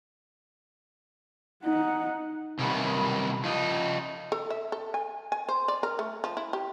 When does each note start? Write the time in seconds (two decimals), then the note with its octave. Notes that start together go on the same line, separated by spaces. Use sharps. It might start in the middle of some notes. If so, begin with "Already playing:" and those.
1.64 D#4 F#5
2.59 C3 D#3 F#3 G3 A#3 B3
3.44 F3 D#4
4.32 A4
4.50 E5
4.72 A4
4.94 G#5
5.32 G#5
5.48 C5
5.68 D5
5.83 A#4
5.99 A3
6.24 F3
6.37 E4
6.53 G4